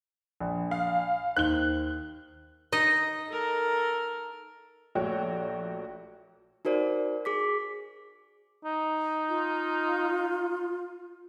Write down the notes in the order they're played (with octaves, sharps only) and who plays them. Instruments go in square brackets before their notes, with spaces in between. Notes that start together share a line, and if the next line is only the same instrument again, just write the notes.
[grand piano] A#1
[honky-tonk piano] F5
[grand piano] D#2 G7 [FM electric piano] D#4 C5 [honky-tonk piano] F#6
[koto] D#4 D#5
[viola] A4 A#4
[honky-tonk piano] A#1 A3 F#4 G4 C#5 G5
[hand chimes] D#4 F#4 A#4 C5 D5
G#4 D6 B6
[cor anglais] D#4
[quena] F4